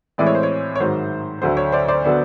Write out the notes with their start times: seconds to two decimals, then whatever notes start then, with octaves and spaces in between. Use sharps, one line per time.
0.18 A2 E3 G#3 C4 D5
0.26 C#5
0.35 C5
0.43 C#5
0.76 C#5
0.80 G#2 D#3 F#3 C5
1.42 D2 D3 F#3 C5
1.57 C#5
1.72 C5 D5
1.88 C5 D5
2.04 D3 F#3 B3 D4